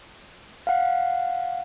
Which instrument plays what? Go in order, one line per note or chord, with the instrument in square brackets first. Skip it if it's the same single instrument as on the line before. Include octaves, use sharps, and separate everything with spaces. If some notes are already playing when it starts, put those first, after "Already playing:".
[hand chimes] F5 F#5